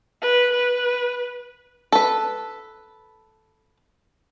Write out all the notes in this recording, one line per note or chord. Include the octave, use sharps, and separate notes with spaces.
B4
B4
A4 B4